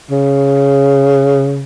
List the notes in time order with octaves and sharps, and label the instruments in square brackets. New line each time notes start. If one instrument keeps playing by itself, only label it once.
[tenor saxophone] C#3